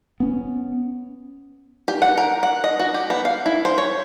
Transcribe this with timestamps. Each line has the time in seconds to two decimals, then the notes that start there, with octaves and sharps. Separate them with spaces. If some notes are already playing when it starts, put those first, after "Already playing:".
0.20 B3 C#4
1.88 G4
2.02 F#5
2.17 A#4
2.43 F#5
2.64 D#5
2.80 F#4
2.94 G4
3.10 B3
3.25 F5
3.46 E4
3.65 C5
3.78 C#5